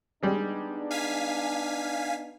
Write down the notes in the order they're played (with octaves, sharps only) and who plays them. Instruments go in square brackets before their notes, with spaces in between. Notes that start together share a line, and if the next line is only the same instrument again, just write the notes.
[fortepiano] G3 G#3 [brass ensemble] B3 D4 D#4
[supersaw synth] F5 G#5 B6